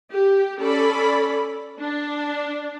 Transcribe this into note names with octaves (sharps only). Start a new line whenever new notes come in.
G4
C#4 A4 D5 B5
D4